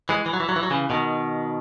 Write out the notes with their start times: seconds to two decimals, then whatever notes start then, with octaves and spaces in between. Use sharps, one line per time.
0.09 E3 G#3
0.26 E3
0.33 F#3
0.40 E3
0.49 F#3
0.56 E3
0.63 F#3
0.70 C#3 E3
0.90 B2 D#3